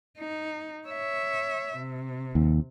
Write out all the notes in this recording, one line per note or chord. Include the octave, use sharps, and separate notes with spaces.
D#4
C#5 E5
C3
D#2